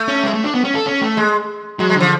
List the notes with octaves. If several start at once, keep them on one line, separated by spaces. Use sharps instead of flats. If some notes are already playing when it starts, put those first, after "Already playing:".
Already playing: A3
C#4
G#3
A3
D4
B3
C#4
A4
C#4
A3
G#3
F#3 G#3
G#3
D3
F3